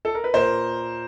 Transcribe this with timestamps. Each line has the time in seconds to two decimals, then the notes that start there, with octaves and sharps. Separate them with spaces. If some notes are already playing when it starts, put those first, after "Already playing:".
0.05 A4
0.15 A#4
0.24 B4
0.34 A#2 A#4 C5